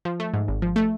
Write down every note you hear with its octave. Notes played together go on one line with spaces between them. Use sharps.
F3
A3
G#2
G#1
F3
A3